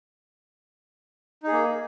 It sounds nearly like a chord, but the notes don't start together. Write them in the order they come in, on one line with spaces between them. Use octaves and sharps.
D#4 G#4 A#3